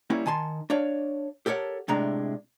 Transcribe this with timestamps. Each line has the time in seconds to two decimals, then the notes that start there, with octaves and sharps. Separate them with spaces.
0.10 G3 A#3 C#4 E4
0.26 D#3 G#5 A5 C6
0.70 D4 C#5 F5
1.46 G4 A4 A#4 C#5 F#5
1.88 A2 C3 G#3 D4 A#5